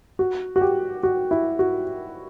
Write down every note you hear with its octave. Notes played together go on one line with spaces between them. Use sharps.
F#4
F#4
G4
F#4
E4
F#4